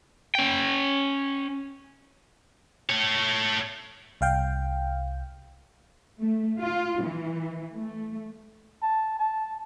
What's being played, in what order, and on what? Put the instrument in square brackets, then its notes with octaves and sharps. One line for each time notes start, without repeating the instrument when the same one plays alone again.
[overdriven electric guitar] C#4 G5
[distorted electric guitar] A3 C#5
[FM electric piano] C2 F5 G5
[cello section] A3
F4
E3
A3
[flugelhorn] A5
A5